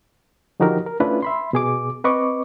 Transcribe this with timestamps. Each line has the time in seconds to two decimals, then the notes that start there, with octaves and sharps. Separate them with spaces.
0.60 D3 F3 D#4 F#4 G4 A#4
0.86 A#4
1.00 A3 C#4 D4 E4 F4 B4
1.23 E5 B5 C6
1.53 B2 G#4 D6
2.04 C4 B4 D#5 C#6 D6